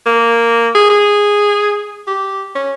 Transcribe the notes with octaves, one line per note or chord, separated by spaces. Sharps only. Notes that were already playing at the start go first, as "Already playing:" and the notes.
A#3
G#4
G#4
G4
C#4